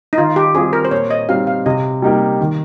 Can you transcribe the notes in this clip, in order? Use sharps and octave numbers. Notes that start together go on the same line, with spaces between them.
D#4
D#3 F4
G4
G3 C4 F4 G#4
A#4
C5
A#2 C#5
D#5
G3 C4 D#4 F5
F5
C3 D#5
G3 A#3 D#4 G4
D#3